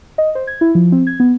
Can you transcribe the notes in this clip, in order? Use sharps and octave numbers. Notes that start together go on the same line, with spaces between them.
D#5
C5
G#6
E4
F3
C4
G#6
B3